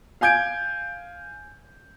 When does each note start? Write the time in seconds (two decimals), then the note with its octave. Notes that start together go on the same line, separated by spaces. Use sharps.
0.21 F5 G#5 G6 G#6 D7